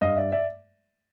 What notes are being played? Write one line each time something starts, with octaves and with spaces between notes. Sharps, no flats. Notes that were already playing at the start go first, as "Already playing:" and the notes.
G2 D#5 F5
D5 E5
D5 E5